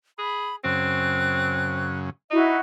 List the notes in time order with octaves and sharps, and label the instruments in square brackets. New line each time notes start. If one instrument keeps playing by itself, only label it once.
[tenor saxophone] G#4 [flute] B5
[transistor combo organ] F#2 C#3 [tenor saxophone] C4 [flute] F#6
[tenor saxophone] D#4 [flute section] E4 F#4 [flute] E5